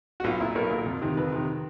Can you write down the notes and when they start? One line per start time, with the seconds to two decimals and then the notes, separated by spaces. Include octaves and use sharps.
0.20 F#4
0.24 B1 F4
0.40 A#2 E4
0.55 B1 A#4
0.70 A#2
0.86 F2
1.02 C3 D#3
1.17 F2 B4
1.32 C3 D#3